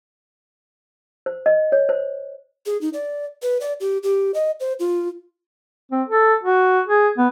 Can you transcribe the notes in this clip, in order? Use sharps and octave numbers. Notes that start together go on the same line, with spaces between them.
C5
D#5
C#5
C5
G#4
D#4
D5
B4
D5
G4
G4
D#5
C5
F4
C4
A4
F#4
G#4
B3